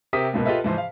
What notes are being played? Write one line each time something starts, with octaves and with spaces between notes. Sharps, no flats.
C3 G4 A#4 E5 D#6 B6
C#2 G#2 B2 A#3 B3
F4 G4 A4 B4 D#5 E5
G#2 E3 F3 C5
F5